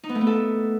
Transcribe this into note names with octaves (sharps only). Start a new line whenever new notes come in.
D#4
B3
A3
B3
A4